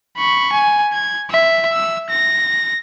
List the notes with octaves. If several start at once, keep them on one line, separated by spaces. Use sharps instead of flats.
B5 C#6
G#5
G#6
E5
E6
A#6